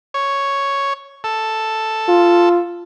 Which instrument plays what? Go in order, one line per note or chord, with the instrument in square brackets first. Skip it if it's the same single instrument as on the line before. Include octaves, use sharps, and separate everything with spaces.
[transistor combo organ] C#5
A4
[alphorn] F4